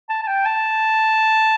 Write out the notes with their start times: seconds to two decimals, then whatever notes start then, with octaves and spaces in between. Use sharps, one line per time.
0.10 A5
0.23 A5
0.27 G5
0.46 A5